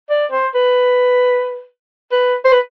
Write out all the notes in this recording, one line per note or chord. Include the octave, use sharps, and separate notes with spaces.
D5
C5
B4
B4
C5
B4